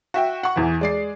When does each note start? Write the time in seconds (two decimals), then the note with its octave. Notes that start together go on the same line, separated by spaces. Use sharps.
0.14 F#4 E5 G5
0.43 F#5 C#6
0.56 E2 E3
0.81 G#3 D5 C7